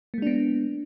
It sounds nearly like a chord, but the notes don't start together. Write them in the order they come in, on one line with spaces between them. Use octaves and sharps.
A#3 G#3 D4 B3